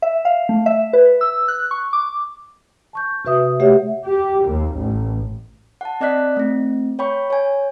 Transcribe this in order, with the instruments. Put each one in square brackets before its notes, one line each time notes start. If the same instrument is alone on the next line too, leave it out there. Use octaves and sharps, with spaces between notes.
[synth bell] E5
F5
A3
E5
B4
E6
F#6
C#6
D6
[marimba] A5 C#6 G6
C3 F#4 B4 E5 D#6
A3 G4 B4 C#5 E5 F#5
[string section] G4
D#2
A1
[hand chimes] F#5 A5
C4 D5 D#5 F#6 B6
A3 C4
C#5 G5 B5 C#6
C#5 G#5